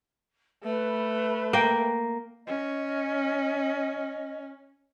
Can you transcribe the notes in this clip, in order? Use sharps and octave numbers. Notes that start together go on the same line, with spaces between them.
A3 B4
A#3 G5
C#4 D#5